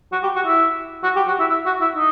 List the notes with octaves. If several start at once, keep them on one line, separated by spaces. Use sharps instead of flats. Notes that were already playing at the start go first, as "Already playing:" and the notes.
F#4
G4
F#4
E4
F#4
G4
F#4
E4
E4
F#4
E4
D#4